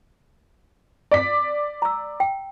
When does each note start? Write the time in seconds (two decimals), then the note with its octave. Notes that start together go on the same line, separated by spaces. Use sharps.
1.11 D5 D6 B6
1.82 A#5 E6
2.20 G5